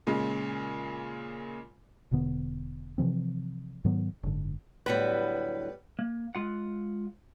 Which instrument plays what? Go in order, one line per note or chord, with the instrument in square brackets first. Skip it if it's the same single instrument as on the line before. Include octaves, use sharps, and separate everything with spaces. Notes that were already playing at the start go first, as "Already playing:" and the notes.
[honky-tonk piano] A#2 C#3 G#3
[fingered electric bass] E1 B2 D3 B3
C3 E3 F3 C4
G#2 D#3 F#3 B3
F#1 G#2 D3
[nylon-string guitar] A2 D3 F#3 [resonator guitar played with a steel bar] G3 B3 B4
[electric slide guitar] A#3
G#3 F4 F#5